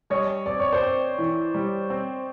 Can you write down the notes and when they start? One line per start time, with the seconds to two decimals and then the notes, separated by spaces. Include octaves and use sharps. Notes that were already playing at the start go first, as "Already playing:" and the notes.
0.10 G3 C#5 D#5
0.46 C4 D5
0.59 C#5
0.73 C5 D5
0.83 C4
1.18 E3
1.54 G3
1.90 C4